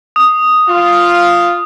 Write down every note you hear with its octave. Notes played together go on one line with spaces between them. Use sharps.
D#6
F4